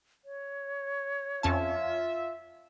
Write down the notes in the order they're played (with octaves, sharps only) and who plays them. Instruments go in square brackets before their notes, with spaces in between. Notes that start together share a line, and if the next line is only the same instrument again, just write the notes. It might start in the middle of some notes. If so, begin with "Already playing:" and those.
[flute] C#5
[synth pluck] F2 C#4 A5 [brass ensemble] F4 E5